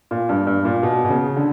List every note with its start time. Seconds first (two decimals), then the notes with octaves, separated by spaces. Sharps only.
0.11 A#2
0.29 G2
0.47 G2
0.65 A#2
0.83 B2
1.04 B2
1.10 C#3
1.37 D3